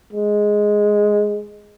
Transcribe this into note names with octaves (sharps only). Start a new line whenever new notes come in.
G#3